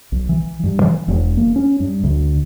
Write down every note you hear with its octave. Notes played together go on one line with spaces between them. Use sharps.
B1
E3
G2
E3
E1
A#3
C#4
G2
D2